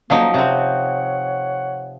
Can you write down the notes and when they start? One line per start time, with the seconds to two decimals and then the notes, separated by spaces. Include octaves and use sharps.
0.10 D2 F3 F#3 A#3 D#4
0.34 C3 C4 C#5 F#5